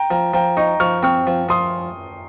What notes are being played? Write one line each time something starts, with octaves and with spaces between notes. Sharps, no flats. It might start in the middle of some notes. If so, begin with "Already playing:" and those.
Already playing: G5 A#5
F3 G5 A#5
F3 G5 A#5
D#4 A#5 C#6
F3 C#6 F6
C4 C#6 F6
F3
F3 C6 D#6